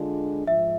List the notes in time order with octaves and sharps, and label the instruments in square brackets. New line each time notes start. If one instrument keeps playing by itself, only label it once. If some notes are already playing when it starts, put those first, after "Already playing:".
Already playing: [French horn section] D3 G#3 D4 F4
[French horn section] G#2 F3 [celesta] E5